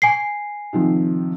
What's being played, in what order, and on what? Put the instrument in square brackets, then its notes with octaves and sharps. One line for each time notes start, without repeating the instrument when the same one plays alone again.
[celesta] G#5 C7
[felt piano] C3 D#3 F3